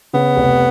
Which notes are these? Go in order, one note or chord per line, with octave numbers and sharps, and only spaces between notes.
C#3 B3
F1